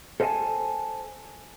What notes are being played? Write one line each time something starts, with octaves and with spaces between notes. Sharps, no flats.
A4 C5 D#5 F5 G#5 A5